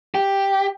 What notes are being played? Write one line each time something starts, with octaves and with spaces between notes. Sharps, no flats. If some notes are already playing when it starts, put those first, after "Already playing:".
G4